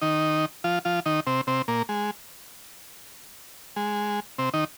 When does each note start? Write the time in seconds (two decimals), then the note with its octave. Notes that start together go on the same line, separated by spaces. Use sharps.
0.01 D#3 D#4
0.64 F3 F4
0.85 F3 F4
1.06 D#3 D#4
1.27 C3 C4
1.47 C3 C4
1.68 A#2 A#3
1.89 G#3
3.76 G#3
4.39 C3 C4
4.54 D#3 D#4